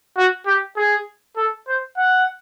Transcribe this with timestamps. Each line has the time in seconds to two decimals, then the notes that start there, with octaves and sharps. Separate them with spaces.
0.17 F#4
0.46 G4
0.77 G#4
1.36 A4
1.68 C5
1.97 F#5